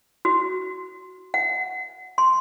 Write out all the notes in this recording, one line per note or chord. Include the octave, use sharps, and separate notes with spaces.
F#4
F#5
C6